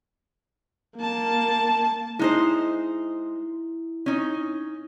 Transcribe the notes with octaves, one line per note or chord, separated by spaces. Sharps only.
A#3 A5
G#3 D#4 E4 C5
C#4 D#4